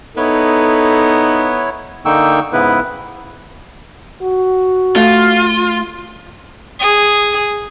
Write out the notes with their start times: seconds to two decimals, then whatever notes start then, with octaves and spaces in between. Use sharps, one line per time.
0.17 B3 D#4 E4 A4 C#5
2.06 D3 A#3 D#4 G5 C#6 E6
2.53 G#2 C#3 B3 E4 B4
4.22 F#4
4.96 A3 F4
6.81 G#4